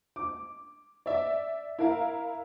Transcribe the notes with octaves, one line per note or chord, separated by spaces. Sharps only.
D6
D5 E5
E4 A#4 F5